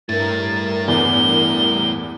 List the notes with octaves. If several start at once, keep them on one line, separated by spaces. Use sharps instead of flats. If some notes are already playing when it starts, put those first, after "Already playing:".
G2 A3 E4 A#4 A6
E2 G7